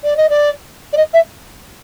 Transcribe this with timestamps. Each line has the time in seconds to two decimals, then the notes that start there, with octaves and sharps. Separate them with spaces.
0.04 D5
0.17 D#5
0.29 D5
0.93 D5
0.97 D#5
1.13 E5